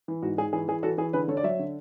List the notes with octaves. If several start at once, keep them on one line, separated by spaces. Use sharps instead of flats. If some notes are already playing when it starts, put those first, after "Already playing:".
E3
G#2 F#4
G#2 G#4
E3 G#4
E3 G#4
E3 F#4 A4
E3 G#4
D3 G#4 B4
D3 A4 C#5
D5
F#3 C#5 E5
D3